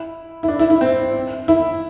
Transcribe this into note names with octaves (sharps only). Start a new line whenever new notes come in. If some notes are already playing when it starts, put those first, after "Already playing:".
Already playing: E4
E4
D4
E4
E4
C4
E4